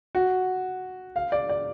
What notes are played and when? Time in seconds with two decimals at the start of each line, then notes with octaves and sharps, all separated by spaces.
0.15 F#4
1.16 F5
1.32 D5
1.49 D5